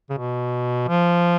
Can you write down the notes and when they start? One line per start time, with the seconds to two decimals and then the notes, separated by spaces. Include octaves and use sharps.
0.10 C#3
0.18 B2
0.88 F3